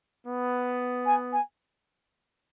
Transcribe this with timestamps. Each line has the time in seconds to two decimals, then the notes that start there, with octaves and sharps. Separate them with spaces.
0.27 B3
1.06 G#5
1.33 G#5